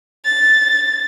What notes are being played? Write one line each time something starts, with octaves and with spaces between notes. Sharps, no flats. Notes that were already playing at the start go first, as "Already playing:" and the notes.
A6